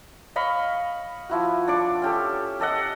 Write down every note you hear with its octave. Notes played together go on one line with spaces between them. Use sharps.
D#5 F5 B5 C#6
F3 E4 F#4
D4 C#6 D6
C#4 G4 A4
G4 A4 D#5 F#5